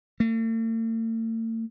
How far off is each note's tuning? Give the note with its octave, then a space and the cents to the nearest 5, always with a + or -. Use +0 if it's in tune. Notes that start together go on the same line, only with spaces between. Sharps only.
A3 +45